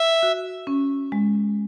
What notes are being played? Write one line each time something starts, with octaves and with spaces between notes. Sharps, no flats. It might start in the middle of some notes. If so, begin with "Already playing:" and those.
Already playing: E5
F#4
C#4
G#3